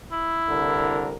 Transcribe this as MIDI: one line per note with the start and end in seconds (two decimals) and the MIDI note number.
0.12 1.10 64
0.48 1.16 36
0.48 1.16 50
0.48 1.16 70